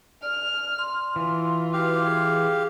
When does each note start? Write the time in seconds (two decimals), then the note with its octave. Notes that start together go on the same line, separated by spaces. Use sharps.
0.22 D5 F6
0.79 C6
1.16 E3 F4
1.73 F#4 G4 B4 F5
2.06 G#4